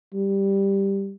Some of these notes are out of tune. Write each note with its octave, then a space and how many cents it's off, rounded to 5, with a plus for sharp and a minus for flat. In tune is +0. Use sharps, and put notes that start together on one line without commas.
G3 +5